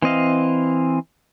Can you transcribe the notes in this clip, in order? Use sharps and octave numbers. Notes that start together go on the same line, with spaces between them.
E3 C4 D#5 F5